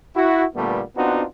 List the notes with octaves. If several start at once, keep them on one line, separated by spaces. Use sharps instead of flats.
E4 F#4
A#2 D3 G3 A3 B3
B3 C4 D4 D#4 F4 F#4